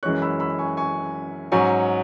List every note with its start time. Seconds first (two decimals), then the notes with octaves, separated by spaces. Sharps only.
0.03 F#2 E3 G#3 C#4 C#6 F#6
0.22 B5 E6
0.40 B5 E6
0.58 G#5 C#6
0.77 G#5 C#6
1.52 G#2 F#3 C#4 G#5 C#6